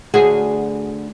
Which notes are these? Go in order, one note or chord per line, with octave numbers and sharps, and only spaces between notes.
D2 F#4 G#4